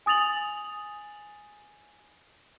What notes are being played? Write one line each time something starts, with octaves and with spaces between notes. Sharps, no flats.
G#5 D#6 A6 F7 F#7